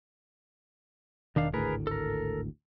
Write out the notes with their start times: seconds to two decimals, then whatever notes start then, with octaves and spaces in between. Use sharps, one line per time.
1.36 E1 D#3 D4 F5
1.54 G#1 D2 A2 G#4 A#4 B4
1.87 A4 A#4